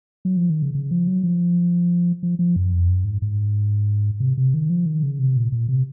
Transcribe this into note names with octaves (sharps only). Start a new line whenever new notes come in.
F#3
F3
D#3
C#3
C#3
F3
F#3
F3
F3
F3
F#2
F2
F#2
G#2
G#2
C3
C3
D#3
F3
D#3
C#3
C3
A#2
A#2
C3